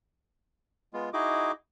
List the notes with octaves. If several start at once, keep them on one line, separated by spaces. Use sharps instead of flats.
G#3 B3 F4
D#4 E4 F#4 G#4 D#5 D6